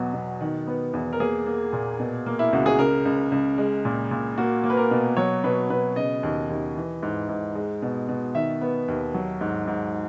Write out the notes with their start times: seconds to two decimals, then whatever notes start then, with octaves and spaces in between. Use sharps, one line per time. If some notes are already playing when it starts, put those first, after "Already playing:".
Already playing: E2 B2 F#3 F#4
0.14 B2
0.41 D#3
0.67 B3
0.94 E2
1.13 A#4
1.20 A#3 G#4
1.47 A#3
1.73 A#2
2.00 B2
2.26 A#3
2.39 E4
2.53 C#2 F#4
2.66 G#4
2.79 C#3 A#4
3.05 C#2
3.32 C#2
3.58 G#3
3.85 A#2
4.11 A#2
4.38 A#3 F#4
4.64 A#3
4.70 B4
4.77 A#4
4.91 B2
5.17 F#3 C#5
5.44 B2 B4
5.70 B2 B4
5.96 C#3 D#5
6.23 D#2
6.50 D#2
6.76 E3
7.03 G#2
7.29 G#2
7.55 G#3
7.82 B2
8.09 B2
8.35 D#3 E5
8.61 B3
8.88 D#2
9.14 F#3
9.41 G#2
9.67 G#2